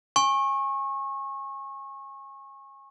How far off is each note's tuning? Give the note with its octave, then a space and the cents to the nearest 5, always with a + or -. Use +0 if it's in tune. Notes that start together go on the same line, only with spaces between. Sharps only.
G#5 -10 C#6 -30